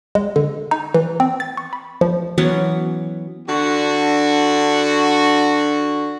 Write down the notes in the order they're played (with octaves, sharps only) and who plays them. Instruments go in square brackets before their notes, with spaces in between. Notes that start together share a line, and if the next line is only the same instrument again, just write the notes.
[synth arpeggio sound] G#3
D3
D#4
E3
C4
A6
C#6
B5
F3
[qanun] E3 F#3 B3 C#4
[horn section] D3 D4 F#4